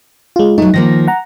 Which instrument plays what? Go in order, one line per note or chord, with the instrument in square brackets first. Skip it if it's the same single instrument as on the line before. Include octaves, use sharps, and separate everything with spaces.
[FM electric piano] G#3 F4
[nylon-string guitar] F#3 A3 [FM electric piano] D#4
[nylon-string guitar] D#3 F3 A#3 [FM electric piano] A#6
[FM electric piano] F#5 A#5